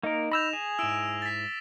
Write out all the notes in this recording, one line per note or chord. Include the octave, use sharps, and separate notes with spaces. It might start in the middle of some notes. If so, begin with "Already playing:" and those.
A#3 D#4 A#4 D#5
B5 E6 G6 A#6 E7 F7
G#4
G#2 E4 E6 D7 E7
A6 B6